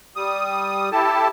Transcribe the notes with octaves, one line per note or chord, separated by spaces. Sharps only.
G3 D#6
E4 G4 A4 A5